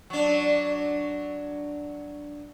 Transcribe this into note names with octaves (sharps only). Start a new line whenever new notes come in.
F#3 D4